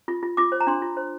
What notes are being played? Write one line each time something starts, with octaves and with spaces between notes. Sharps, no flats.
F4
F4
F4 D6
C5
A#5
D4 C6
F4
C5